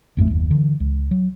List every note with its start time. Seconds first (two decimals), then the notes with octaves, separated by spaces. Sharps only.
0.17 A1 F2 G#2 A3
0.30 F#1 D#2
0.51 D3 E3
0.80 C#2
1.11 F#3